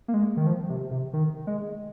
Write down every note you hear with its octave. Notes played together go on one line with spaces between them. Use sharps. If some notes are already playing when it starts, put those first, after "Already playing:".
A#3
G#3
D#3
F3
C3
C3
D#3
G#3